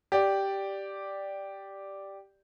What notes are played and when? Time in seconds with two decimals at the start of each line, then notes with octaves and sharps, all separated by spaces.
0.12 G4 D5